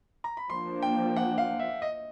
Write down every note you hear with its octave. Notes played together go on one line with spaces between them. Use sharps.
A#5
B5
F3 A#3 D4 C6
G5
F#5
F5
E5
D#5